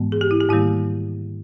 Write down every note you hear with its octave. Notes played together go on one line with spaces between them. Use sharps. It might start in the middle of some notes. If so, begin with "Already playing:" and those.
Already playing: G#2 E3 G#3 B3
G#4
G4
E4
G4
G#2 D#3 G3 A#3 E4